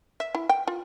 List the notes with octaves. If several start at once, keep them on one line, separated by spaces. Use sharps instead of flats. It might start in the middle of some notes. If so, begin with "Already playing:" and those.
E5
E4
G5
F4